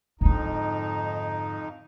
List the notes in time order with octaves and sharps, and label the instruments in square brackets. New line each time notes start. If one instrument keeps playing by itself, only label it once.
[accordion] F2 D#4 [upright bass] G#2 D3